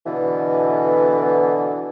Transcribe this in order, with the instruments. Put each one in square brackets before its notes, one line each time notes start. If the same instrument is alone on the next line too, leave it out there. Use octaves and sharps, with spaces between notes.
[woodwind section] B2 D3 E3